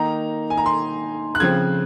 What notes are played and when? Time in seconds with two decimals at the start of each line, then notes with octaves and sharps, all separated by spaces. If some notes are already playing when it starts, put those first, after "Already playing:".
Already playing: D#3 A#3 D#4 A#5
0.50 G#5
0.58 A#5
0.66 C6
1.35 F#6
1.40 C#3 F3 C4 G#6